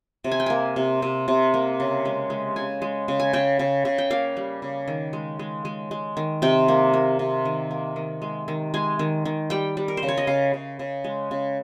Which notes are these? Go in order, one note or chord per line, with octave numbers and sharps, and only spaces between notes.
C3
G#5
G5
A#3 G#5
C3
C3
C3
A#3
C#3
G#3
G#3
C#3 G#5
G#3
C#3
G#5
C#3 G5
C#3
C#3
G5
A#3 F5
G3
C#3
D#3
G#3
G#3
G#3
G#3
D#3
C3 G5
A#3
A#3
C3
D#3
A#3
D#3
G#3
D#3
G#3 G#5
D#3
D#3
G3 G5
G3
A#4
C5
C#3
C#5
D#5
C#3 F5
C#3
C#3
G#3
C#3